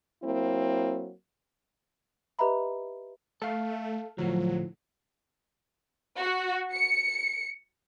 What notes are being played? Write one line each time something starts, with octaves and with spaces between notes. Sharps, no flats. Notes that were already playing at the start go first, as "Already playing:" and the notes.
F#3 A#3 C4 E4
G4 B4 D#5 E5 A#5 B5
A3 A4 F5
D2 A2 F3 F#3
F#4
C#7